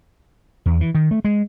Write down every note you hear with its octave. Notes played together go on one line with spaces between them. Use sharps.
E2
E3
D#3
A3
G#3